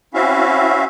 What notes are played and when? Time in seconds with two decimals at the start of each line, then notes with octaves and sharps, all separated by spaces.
0.14 C4 C#4 E4 F#4 E5 F5